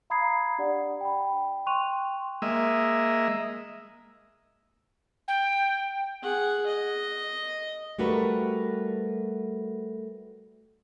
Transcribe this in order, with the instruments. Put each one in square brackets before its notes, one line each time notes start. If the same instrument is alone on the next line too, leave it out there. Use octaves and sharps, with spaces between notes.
[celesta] F5 A#5 B5 D#6 G#6 C7
D4 G4 D5 F#5
G5 B5
G5 C6 C#6 F#6 D#7 F7
[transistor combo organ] G#3 A#3 D#5 E5
[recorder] G5
[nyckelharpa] G#4 F#5
D#5
[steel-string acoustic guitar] G3 A3 F#4 A#4 B4